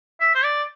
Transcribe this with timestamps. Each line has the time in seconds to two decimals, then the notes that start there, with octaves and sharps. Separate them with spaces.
0.20 E5
0.35 C5
0.44 D5